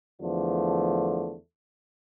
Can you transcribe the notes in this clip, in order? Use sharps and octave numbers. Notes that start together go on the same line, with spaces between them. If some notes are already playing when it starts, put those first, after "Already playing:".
E2 D3 F3 A3